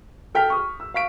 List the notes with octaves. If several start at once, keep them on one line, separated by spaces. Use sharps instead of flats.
A4 G5 F6 B6
C#6 D#6 F6
E6
F5 C#6 B6 D7